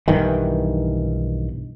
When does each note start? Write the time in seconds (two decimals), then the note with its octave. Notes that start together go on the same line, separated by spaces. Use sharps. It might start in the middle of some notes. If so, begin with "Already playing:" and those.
0.08 B1 G2 D#3 E3